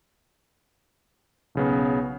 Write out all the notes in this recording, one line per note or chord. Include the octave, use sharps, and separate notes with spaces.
B1 C#3 B3